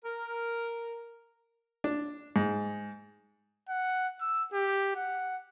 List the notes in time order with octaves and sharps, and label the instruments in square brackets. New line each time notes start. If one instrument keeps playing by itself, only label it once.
[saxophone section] A#4
[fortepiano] D4
G#2
[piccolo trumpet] F#5
E6
G4
F#5